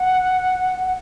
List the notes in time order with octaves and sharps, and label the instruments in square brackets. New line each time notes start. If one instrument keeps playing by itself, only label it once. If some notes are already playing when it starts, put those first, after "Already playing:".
Already playing: [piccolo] F#5